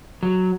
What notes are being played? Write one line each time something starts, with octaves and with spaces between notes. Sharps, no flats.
F#3